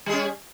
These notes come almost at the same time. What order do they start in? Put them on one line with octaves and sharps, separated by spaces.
G3 G#4 C#4